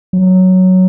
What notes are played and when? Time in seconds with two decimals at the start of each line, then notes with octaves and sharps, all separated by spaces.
0.13 F#3